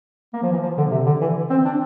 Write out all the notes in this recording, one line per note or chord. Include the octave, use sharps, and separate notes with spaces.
A#3
F3
E3
F3
D3
C3
D3
E3
C4
D4